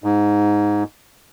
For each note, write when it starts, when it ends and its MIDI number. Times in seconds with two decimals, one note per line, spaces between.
0.04 0.83 44